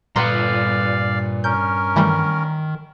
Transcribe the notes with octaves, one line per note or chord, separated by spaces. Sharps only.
G2 A#2 B4 D5 F5 F#5 A#5 C6
C#4 A#4 G6
D#3 E3 G3 A3